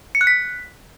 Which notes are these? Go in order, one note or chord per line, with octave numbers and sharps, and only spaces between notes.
C#7
F#6
B6